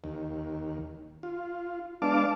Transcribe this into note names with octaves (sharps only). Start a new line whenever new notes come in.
D#2
F4
G#3 B3 D4 F5 A5 D6